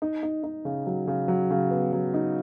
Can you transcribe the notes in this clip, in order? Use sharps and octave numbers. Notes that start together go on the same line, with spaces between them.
D#4
D#4
D#4
C#3
F#3
C#3
F#3
C#3
B3
F#3
D#4